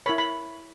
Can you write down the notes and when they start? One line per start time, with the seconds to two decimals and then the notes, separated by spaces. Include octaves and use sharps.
0.06 E4 A#4 C#5 B5
0.18 B5